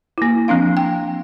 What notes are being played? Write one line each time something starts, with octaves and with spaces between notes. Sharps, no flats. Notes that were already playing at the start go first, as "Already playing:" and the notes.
A#3 E4
F3 C4 D4 F5
G5